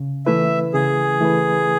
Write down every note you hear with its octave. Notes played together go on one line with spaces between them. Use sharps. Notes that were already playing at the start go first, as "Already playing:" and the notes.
Already playing: C#3
E3 A3 E4 B4 E5
C#3 G#4
E3 A3 E4 B4